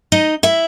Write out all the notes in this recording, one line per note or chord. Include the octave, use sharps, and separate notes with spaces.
D#4 D#5
E4 E5